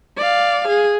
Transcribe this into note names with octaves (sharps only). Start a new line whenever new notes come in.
D5 F5
G#4